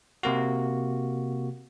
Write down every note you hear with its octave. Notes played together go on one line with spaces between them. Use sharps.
C3 A#3 F#4